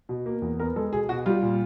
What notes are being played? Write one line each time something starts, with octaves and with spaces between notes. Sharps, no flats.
B2
A#3
E2
B3 A#4
G#3 A4
B2 G#4
B2 F#4
G3 F4
A#2